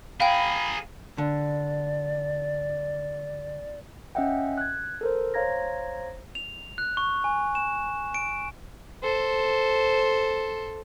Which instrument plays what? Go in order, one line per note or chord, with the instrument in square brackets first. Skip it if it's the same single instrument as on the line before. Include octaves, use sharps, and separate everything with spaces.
[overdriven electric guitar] G#4 A#4 [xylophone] F5 G5 [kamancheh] B5
[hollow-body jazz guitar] D3 [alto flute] D5
[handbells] C#4 D#5 E5 F#5 G5
F#6 G#6
A4 A#4 C5
C5 C#5 F5 A#5 G#6 A#6
[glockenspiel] F7
F#6
C#6
G#5
E7
D7
[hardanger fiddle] A4 C5